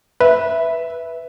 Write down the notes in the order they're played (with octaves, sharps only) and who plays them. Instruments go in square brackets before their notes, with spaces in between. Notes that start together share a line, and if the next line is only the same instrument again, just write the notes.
[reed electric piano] B4 [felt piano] E5